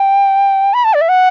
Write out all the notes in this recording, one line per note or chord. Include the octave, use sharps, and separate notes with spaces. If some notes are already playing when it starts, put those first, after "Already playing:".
Already playing: G5
B5
A5
D5
E5
F#5